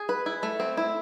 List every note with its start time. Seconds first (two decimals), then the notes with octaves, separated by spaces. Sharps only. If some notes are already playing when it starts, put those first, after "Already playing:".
Already playing: G#4
0.09 B4
0.26 E4
0.43 A3
0.60 C4
0.77 E4